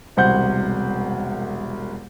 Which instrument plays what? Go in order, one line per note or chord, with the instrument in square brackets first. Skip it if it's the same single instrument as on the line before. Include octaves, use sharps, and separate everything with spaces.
[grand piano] E1 C2 C5 F#5 G6